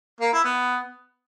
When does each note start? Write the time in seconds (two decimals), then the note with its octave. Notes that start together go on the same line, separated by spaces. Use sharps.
0.21 A#3
0.33 E4
0.45 B3